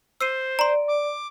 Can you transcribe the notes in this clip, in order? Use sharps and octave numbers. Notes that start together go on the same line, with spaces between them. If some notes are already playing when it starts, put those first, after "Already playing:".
C5 E6 C7 D#7
D5 A#5 C6
D6